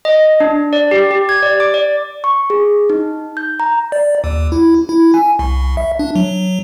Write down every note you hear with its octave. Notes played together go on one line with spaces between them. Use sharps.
D#5
D4
D5
G4
G4
G#6
D5
D6
D5
C#6
G#4
D#4
G6
A#5
D5
D#2
E4
E4
G#5
C2
E5
D4
F#3